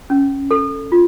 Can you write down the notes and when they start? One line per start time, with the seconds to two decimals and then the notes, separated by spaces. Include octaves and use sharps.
0.10 C#4
0.51 A4
0.92 F4